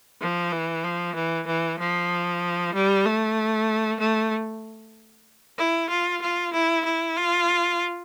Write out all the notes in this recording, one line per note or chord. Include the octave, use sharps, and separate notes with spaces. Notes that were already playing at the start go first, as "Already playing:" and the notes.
F3
E3
F3
E3
E3
F3
G3
A3
A3
E4
F4
F4
E4
E4
F4